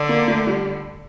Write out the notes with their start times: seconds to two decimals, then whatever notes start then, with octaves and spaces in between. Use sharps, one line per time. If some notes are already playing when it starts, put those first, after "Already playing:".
Already playing: D3
0.09 A#3
0.28 A3
0.47 G3